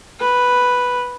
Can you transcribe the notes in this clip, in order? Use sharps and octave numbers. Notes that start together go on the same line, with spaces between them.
B4